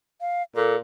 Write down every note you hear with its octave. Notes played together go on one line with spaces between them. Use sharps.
F5
A#2 A4